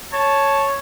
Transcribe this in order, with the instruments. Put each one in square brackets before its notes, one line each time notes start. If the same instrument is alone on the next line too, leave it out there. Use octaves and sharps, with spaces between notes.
[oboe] C#5 [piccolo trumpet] A5